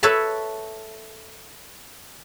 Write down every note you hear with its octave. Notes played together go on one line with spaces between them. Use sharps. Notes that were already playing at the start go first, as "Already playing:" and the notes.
A4 B4 C#5 E5 A5 B5